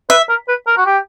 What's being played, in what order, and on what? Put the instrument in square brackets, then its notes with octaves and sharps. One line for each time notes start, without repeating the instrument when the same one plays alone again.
[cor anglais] B4 [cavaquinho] E5
[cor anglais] A#4
B4
A#4
F#4
G4